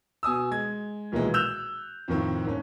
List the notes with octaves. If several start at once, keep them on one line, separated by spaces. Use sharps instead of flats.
B2 G#5 D#6 E6
G#3 G#6
B1 A#2 D#3 E3 G#3
E6 F#6 G6 E7 F7
F2 A2 D#3 C4
G#1 C#4